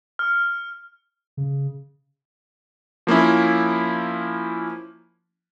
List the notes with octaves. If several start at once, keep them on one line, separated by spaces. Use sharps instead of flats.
F6
C#3
F3 A#3 C#4 E4